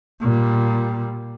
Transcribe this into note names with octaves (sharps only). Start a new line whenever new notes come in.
A#2 G3